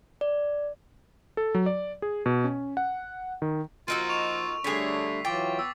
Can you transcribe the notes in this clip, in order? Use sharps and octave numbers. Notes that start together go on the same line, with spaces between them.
D5
A4
F#3
D5
G#4
B2
C#4
F#5
D#3
F3 A#3 D#4 F4 F#4 E6 D#7
C#6 F7
D3 G3 A3 D4 G#4 C#5 B6 C7
E3 F#3 F4 G5 D6 A6
B3 E6